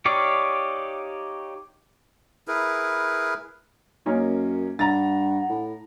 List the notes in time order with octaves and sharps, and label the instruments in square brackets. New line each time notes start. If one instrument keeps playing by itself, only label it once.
[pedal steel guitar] D#4 G4 C#5 D5 F5
[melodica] E4 G#4 A#4 B4
[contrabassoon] F#2 [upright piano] A#3 C#4 D#4
[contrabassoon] G2 [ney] F#5 [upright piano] A#5 A6
[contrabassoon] A2